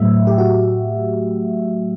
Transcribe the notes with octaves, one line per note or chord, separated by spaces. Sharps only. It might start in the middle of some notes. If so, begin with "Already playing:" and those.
Already playing: A2 F#3 A3 E5
G4
F#4